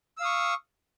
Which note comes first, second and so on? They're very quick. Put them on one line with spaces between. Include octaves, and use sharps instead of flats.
E6 F5 D#6 C#6